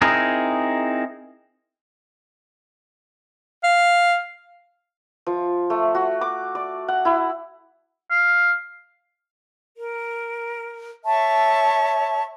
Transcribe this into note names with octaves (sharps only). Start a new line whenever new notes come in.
C4 D#4 E4 G#4 A#4
F5
F3
A3
F#4
D6
D5
F#5
E4
F5
A#4
C#5 E5 A5 C#6